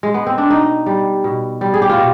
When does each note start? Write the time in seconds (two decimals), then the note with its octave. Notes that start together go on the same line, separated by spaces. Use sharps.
0.03 G#3
0.14 B3
0.27 C4
0.38 D4
0.50 B2 D#4
0.86 G3
1.24 B2
1.61 G3
1.74 G#4
1.82 G4
1.89 F4
1.97 B2